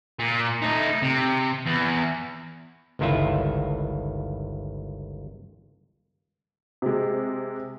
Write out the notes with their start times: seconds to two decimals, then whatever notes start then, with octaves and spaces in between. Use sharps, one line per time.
0.19 A#2
0.62 A3 D#4
1.03 C3
1.66 E2
2.99 G1 C#2 D#3 E4 F4 E5
6.82 C3 G#3